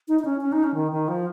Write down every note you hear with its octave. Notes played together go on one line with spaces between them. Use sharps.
D#4
D#4
C#4
C#4
D#4
C#4
D#3
D#3
F3